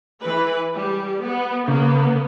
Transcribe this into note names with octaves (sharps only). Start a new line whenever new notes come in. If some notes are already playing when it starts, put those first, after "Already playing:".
E3 B4 B5
G3 G4
B3
C#3 A#3 B3